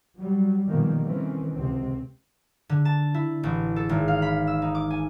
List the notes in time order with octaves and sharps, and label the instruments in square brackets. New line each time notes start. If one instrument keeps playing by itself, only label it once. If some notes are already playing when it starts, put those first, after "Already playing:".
[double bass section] F#3 G3
B2 D#3 F3 G3 G#3 A#3
D#3 E3 A3 C4 C#4
C#2 C3 C4
[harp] D3
A5
E4
A1
A4
G#1
F5
B5
E6
D#4
D6
G#5